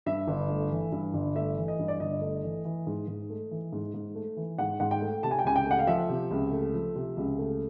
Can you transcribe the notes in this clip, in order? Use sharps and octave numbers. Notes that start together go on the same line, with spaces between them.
G2 E5
G1
A3
E3
G2
G1
A3 E5
E3
D#5
G2
D5
G1 D#5
A3
E3
E3
G#2
G#2
A3
E3
G#2
G#2
A3
E3
G#2 F#5
G#2 F#5
G5
A3
C3 A5
G#5
G5
C#2 G#5
G5
A3 F#5
F5
F3 E5
C3
C#2
A3
F3
C3
C#2
A3